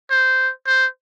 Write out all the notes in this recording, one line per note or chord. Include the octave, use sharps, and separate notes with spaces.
C5
C5